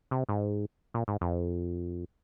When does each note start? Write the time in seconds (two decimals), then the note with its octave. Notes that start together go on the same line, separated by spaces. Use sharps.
0.11 C3
0.29 G#2
0.94 A#2
1.08 G#2
1.21 F2